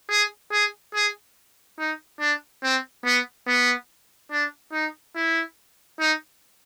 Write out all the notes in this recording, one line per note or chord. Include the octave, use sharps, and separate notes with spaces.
G#4
G#4
G#4
D#4
D4
C4
B3
B3
D4
D#4
E4
D#4